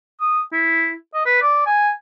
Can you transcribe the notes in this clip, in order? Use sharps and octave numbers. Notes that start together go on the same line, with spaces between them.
D#6
E4
D#5
B4
D5
G#5